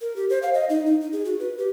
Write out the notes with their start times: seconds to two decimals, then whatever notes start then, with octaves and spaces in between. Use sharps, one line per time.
0.01 A#4
0.16 G4
0.30 C5
0.43 F5
0.54 D#5
0.70 D#4
0.86 D#4
1.01 D#4
1.13 G#4
1.25 F#4
1.39 B4
1.58 G4